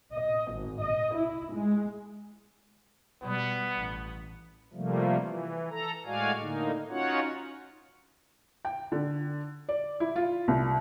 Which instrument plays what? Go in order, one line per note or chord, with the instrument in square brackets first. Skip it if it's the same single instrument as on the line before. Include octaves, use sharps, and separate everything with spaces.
[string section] D#5
G#1
D#5
E4
G#3
[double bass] B2 G3 [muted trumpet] B3
[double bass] A1
[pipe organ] C3 F3 G3 A3 A#3
E3
A4 A#5
A2 G#3 F#4 D5 F5 G#5
A2 D3 A#3 D#4
C#4 D#4 F4 F#4 C#5 F#5
[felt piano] G5
D3
D5
E4
F4
C2